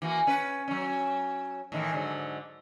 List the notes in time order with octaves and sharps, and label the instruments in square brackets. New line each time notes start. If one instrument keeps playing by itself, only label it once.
[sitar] E3 A#3 F#4
C#4 B4
F#3 C#4
A2 D#3 E3
G#2 D3 F#3